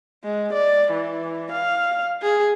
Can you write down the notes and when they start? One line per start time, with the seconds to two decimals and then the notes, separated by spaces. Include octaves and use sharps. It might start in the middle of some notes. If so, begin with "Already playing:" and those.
0.24 G#3
0.53 D5
0.92 E3
1.52 F5
2.22 G#4